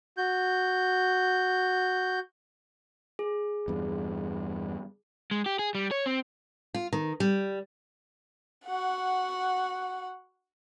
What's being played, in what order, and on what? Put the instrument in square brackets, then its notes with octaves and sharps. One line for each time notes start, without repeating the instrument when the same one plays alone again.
[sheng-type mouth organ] F#4 G6
[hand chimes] G#4
[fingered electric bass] E2 G2
[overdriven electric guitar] G#3
G4
G#4
G3
C#5
C4
[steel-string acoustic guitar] F4
D#3
G3
[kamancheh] F#4 F#5